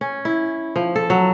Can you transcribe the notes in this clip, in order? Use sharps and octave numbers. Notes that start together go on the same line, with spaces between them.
C#4
E4
F3
A4
F#3